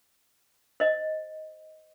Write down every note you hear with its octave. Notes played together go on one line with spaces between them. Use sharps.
C5 D#5